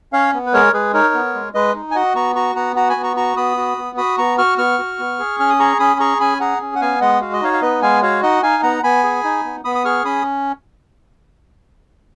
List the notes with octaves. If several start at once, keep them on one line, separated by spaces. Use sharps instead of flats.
C#4 C#5 F5
B3
B4
G#3 A#4 C#5
G#3 G#4 B4
D#4 A#4 C#5
B3
G#3
G#3 B4 D#5
D#4
G#5
F#4 D#5 F#5
B3 A#5 C#6
F#4 A#5 C#6
B3 F#5 A#5
F#4 F#5 A#5
G#5 B5
B3
A#5 C#6
F#4 A#5 C#6
B3 B5 D#6
F#4
B3
F#4 B5 D#6
B3 A#5 C#6
F#4 C#6 F6
B3 C#6 F6
F#4
B3
G#4
C#4 F6
D#6
G#4 A#5 C#6
C#4 B5 D#6
G#4 A#5 C#6
C#4 G#5 B5
G#4 F#5 A#5
C#4
F#5
B3 F5 G#5
G#3 D#5 F#5
F#4 F5
D#5
D#4 C#5 F5
F5
B3 B4 D#5
G#3 F5 G#5
F#4 C#5 F5
D#4 D#5 F#5
D#4 F5 G#5
B3 F#5 A#5
B3 G#5 B5
G#4
D#4
B3
B3 B5 D#6
D#6
G#4 C#6 F6
C#4 B5 D#6